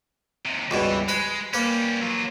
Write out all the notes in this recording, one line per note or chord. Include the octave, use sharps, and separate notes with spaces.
D#2 C3
C#2 G2 B2 E3
G#3 B4 B5
G3 A#3 C#4 B4
F#3 F4